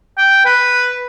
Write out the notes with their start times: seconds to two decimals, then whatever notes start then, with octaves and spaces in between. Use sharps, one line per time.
0.18 G5
0.45 B4